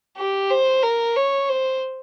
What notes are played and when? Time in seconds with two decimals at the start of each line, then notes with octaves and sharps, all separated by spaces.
0.18 G4
0.50 C5
0.83 A#4
1.16 C#5
1.49 C5